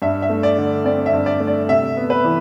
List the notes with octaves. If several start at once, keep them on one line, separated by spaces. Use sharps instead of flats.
G2 E5
E5
A3
D5
D3
C4 D5
E5
G2
D5
A3
D5
C3 E5
B3
B4
E3